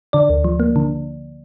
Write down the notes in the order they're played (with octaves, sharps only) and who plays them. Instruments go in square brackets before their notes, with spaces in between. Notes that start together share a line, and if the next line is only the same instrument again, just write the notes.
[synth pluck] D3 D5
D2
F3
A#3
D3